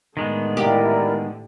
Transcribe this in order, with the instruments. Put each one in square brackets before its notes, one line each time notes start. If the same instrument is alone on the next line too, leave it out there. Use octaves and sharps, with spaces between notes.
[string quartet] A2 D3 [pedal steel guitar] D#3 G#3 B3
[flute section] E4 A#4 D5 [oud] G4